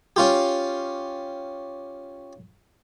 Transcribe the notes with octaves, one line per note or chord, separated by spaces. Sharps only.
C#4 F4 G4